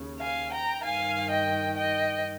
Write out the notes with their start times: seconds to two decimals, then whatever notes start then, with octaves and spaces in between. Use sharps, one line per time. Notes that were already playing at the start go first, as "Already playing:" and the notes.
Already playing: D#2 C#3
0.20 F5 G#5
0.52 G5 A#5
0.83 G2 D#3 F5 G#5
1.30 D#5 G5
1.77 D#5 G5